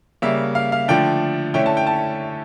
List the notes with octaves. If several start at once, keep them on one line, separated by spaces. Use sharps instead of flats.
C#3 G3 A#3 E5
F5
F5
D3 F3 A3 D4 G5
D3 A3 C#4 E4 G5
A5
G5
A5